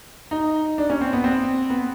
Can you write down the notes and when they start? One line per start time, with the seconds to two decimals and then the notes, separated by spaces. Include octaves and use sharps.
0.31 D#4
0.78 D4
0.90 C#4
1.01 C4
1.13 B3
1.24 C4
1.70 B3